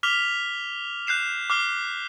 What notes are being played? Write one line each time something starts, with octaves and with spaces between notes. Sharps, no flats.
D6 F6 B6 F7 G7
F#6 G6 C7 E7
D6 F6 C7 G7